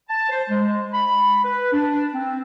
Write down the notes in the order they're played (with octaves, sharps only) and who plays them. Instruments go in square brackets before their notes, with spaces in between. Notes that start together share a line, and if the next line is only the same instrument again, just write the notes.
[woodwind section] A5
C5
G#3
B5
B4
D4
C4